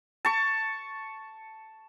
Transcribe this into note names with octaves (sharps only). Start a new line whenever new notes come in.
A5 C#6